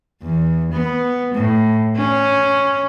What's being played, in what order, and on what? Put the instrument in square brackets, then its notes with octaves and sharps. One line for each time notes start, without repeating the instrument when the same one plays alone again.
[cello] E2
B3
A2
C#4